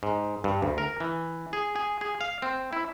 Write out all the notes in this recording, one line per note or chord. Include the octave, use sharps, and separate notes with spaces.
G#2
G2
D2
A#4
E3
G#4
G#4
G#4
F5
C4
E4